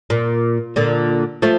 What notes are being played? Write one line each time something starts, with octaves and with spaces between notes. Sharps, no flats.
A#2
A#2 D3
F3 A3